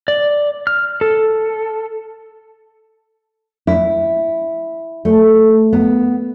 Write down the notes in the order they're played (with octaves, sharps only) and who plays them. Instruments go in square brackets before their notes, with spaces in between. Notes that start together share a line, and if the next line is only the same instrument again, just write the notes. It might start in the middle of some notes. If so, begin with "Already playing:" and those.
[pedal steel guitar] D5
F6
A4
[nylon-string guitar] E4
A3
B3